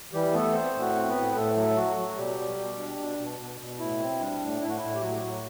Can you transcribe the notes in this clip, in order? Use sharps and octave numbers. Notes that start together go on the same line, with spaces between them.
E3 G3 G4
A3 B3 A4
C4 C5
A2
F#4 F#5
C4
B3 B4
A2
A2 A3 A4
F#3
F#3 F#4
F#3
B2 G3 G4
G3
B2
D4
B2
B2
B2
B2
A2 E4
C4
G3 D4
A2
A2 E4
F#4
A2 E4
G4
A2 F#3 F#4
A2